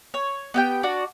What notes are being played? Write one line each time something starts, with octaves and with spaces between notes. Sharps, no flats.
C#5
B3 G4 G5
D4 F#4 D5